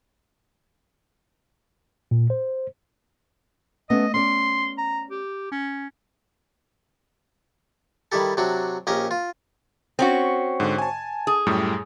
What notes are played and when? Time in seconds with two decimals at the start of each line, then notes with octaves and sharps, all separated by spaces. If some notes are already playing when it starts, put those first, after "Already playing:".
2.11 A#2
2.30 C5
3.90 A3 B3 C#4 D#5
4.14 C#4 D5 C6
4.78 A#5
5.11 G4
5.52 C#4
8.12 D#3 G3 E4 G4 A4
8.37 C3 F#3 D4 F#4
8.87 A#1 C#4 G4 A#4 D#5
9.11 F4
9.99 C4 C#4 F#4
10.60 G#2 D3
10.78 G#5 A5
11.27 G#4
11.46 F#2 A2 G3